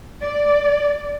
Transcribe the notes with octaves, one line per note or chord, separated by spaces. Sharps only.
D5